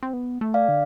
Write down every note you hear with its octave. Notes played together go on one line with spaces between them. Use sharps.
C4
B3
A3
D5 F5
D3